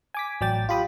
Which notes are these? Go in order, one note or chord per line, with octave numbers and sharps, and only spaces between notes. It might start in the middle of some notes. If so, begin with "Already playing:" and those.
G#5 D6 B6
A1 F#3 D5 G5 A6
F4 G4 B5 D#6